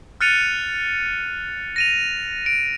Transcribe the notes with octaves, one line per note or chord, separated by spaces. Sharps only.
F6 F#6 A6 C#7 D#7 F7
A#6 D#7 F7
D7